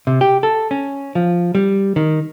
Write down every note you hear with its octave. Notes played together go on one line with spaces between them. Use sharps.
C3
G4
A4
C#4
F3
G3
D#3